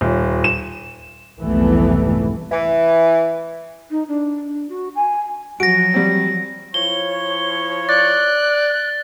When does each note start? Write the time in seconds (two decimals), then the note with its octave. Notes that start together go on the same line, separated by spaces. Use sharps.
0.01 D#1
0.44 E7
1.43 F1 C2 G#2 E3 A3 B3
2.52 E3
3.91 D#4
4.08 D4
4.69 F#4
4.95 G#5
5.60 F3 F#3 F#4 A#6 D7
5.94 G3 C4
6.74 F3 E4 C#5 G7
7.89 D5 F#6 A6